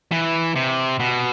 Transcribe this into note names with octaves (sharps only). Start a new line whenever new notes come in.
E3
C3
B2